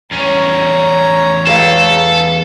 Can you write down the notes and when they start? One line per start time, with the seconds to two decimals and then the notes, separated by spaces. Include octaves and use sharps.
0.12 E2 C#4 C#5 A#5
1.47 G#4 A4 B4 F5